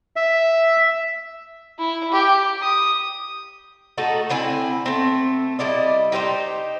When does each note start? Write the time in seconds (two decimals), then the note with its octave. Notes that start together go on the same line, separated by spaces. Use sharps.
0.16 E5
1.79 E4
2.12 G4
2.62 D#6
3.98 A3 D#4 F#4 A4
4.30 D3 C4 E4 G#5
4.86 A3 C4
5.59 G3 E4 D5 D#5
6.12 D#4 G4 B4 C5